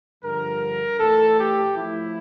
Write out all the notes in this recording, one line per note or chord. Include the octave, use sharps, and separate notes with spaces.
G2 D3 F3 A#4
A2 E3 A4
G4
A2 F3 E4